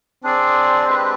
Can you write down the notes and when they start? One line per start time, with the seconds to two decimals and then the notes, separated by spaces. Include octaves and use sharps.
0.23 C4 D4 G#4 D5
0.87 G#3 D4 G4 B4